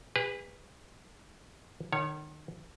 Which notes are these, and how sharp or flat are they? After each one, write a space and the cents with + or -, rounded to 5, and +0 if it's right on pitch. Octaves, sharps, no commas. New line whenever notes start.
G#4 -40 B4 +0
D#3 -30 C#5 +0